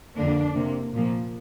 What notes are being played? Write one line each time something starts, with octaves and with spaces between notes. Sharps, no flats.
F2 D3 A#3 D4
C3 A#3
A#2 F3 A#3